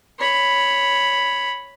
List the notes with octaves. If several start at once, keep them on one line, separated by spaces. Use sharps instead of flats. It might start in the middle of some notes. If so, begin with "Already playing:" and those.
C#5 B5